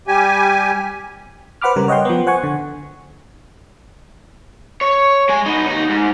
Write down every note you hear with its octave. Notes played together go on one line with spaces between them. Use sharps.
G3 G4 G#5
B4 C5 F#5 B5 D6 F6
C#3 G3 A#4
C#5 D#5 F#5 G5 C6
F3 B3
C5 F#5 G#5 C#6
D3
C#5
G#3 G#5
B3 D#4
D#2 D#4
G#2